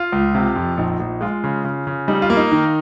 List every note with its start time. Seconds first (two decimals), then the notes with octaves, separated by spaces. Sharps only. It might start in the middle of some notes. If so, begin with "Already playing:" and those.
Already playing: F4
0.12 C#2
0.35 C3
0.56 F2
0.77 A#1 D#4
1.00 A#1
1.21 G#3 F4
1.44 C#3
1.65 C#3
1.87 C#3
2.08 G3 D#4
2.22 F4
2.30 A#3
2.37 D#4
2.52 D#3